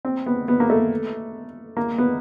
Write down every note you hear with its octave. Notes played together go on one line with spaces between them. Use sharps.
C4
B3
B3
A#3
A3
A#3
B3